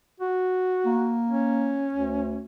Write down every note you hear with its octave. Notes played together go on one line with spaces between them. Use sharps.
F#4
A#3
C#4
D2